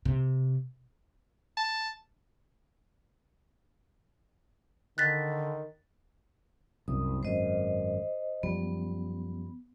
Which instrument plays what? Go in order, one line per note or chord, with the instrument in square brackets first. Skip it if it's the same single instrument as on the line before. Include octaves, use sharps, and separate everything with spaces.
[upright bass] C3
[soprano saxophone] A5
[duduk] D3 [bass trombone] D#3 [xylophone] F#6 A6 B6
[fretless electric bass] C2 F#2 [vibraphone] D#6
[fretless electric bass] G#1 F#2 [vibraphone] C5 D#5
[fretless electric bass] F#2 F3 G3 [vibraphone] B3